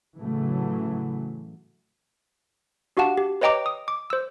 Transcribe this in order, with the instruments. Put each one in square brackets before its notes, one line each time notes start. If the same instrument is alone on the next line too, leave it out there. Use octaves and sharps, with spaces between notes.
[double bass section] A2 C#3 E3 F#3 A3
[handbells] D4 F#4 G4 F5 F#5 A5
G4
B4 C#5 D#5 G5 A#5 D6
D#6
D6
C5 E6